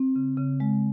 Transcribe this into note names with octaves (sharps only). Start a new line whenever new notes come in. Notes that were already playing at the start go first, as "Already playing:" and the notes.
Already playing: C4
C#3
C#3
G#3